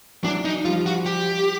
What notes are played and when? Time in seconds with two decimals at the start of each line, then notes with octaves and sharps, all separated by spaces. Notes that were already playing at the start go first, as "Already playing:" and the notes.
0.24 E3 F#3 D4
0.45 D#4
0.65 F3 G3 F4
0.86 F#4
1.06 G4